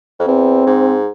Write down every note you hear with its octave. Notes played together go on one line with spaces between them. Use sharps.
F2
E2 C4
G#2